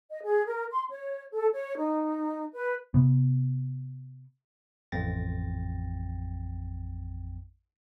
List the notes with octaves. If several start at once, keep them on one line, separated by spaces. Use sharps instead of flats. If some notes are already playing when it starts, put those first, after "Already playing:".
D#5
G#4
A#4
C6
C#5
A4
C#5
D#4
B4
C3 B3
A1 F2 C4 G5 A6 A#6